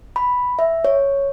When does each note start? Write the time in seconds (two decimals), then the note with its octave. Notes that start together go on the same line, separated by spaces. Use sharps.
0.16 B5
0.59 E5
0.85 C#5